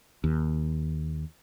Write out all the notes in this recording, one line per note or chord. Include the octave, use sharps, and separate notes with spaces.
D#2